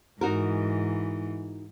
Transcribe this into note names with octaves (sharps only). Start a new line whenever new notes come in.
G#2 E3 D#4 F#4 A#4